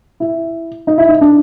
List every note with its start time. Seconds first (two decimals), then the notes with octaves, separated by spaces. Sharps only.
0.20 E4
0.87 D#4
0.98 E4
1.09 D#4
1.21 D4